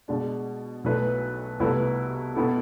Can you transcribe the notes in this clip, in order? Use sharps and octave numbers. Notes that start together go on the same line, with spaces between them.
B2 G#3 D4
B1 B2 A3 E4 B4
C2 B2 A3 E4 B4
B2 B3 E4 A4